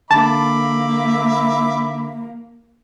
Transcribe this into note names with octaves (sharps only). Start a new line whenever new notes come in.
D3 A#3 E5 A5 B5 D6